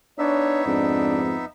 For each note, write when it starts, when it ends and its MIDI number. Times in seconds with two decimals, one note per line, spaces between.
0.19 1.45 59
0.19 0.62 62
0.19 1.45 63
0.19 0.65 73
0.19 1.45 76
0.66 1.42 41
0.66 1.34 44
0.66 1.21 62